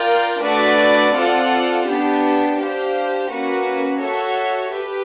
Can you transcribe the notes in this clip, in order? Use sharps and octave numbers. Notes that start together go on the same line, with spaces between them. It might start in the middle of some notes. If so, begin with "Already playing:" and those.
Already playing: F4 A#4 D5 G5
A3 D4 F#4 B4 D5
C4 F4 A4 D5 F#5
B3 D4 G4
D4 G4 C5 F5
A#3 C#4 F#4 B4
F#4 A4 C#5 E5
G4 B4